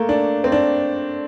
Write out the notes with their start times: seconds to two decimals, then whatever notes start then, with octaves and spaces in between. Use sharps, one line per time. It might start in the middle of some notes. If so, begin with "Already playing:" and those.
Already playing: A3 A#3
0.09 D4
0.44 C4
0.52 D4